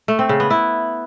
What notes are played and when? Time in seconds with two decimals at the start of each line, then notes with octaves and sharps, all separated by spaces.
0.08 A3
0.19 C4
0.29 C#3
0.40 B3
0.50 E4